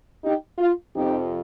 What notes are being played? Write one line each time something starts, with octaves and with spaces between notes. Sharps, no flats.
D#4 G4
F4
F2 C3 F3 C4 D#4 G4